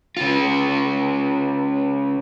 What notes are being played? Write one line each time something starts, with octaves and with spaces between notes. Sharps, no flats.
C#3 F4